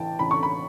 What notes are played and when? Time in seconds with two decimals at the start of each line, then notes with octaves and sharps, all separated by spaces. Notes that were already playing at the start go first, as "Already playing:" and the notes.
Already playing: A1 E3 G5 A5
0.19 A1 B5
0.31 C#6
0.43 B5